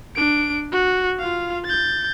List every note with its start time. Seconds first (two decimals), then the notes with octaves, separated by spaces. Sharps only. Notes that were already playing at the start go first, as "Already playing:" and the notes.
0.16 D4 D7
0.72 F#4
1.19 F4 F5
1.65 G6 A6